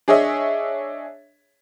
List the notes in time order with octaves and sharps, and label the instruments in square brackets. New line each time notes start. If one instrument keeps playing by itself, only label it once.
[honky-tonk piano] D4 G#4 C#5 D#5 E5